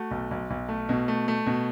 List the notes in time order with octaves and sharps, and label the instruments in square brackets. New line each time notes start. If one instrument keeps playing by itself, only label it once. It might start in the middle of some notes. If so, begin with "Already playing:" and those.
Already playing: [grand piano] A3 F#4
B1
B1
B1
A3
B2
A3
A3
B2